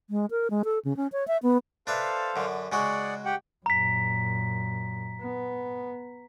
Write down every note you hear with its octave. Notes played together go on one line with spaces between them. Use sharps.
G#3
A#4
G#3
A4
C#3
C#4
C#5
E5
B3
D4 A4 B4 C5 E5 F5
F#2 D3
C#3 G#3 F#4 G#4 D5 F#5
G4 F#5 G5
F#2 A#2 A#5 B6
B3